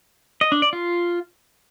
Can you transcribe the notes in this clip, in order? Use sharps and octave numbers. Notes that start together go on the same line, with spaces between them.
D#5
D4
D5
F4